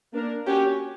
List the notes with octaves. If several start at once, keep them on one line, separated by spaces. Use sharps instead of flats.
A#3 D4 A#4
C#4 F#4 G4 C#5